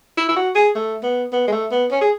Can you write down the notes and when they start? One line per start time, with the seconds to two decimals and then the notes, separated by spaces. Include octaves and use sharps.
0.17 E4
0.29 E4
0.36 F#4
0.55 G#4
0.75 A3
1.03 B3
1.32 B3
1.48 G#3
1.52 A3
1.71 B3
1.91 C#4
2.01 G#4